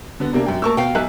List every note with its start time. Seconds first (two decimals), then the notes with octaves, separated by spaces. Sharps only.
0.20 D3 B3
0.33 C3 A#3 D4
0.46 F#2 G5
0.62 A3 A#3 A#4 A5 C#6 E6
0.77 B2 F5 G5
0.95 B1 E5 F#6